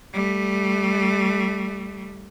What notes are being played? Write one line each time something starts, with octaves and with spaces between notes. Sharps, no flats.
G3 A3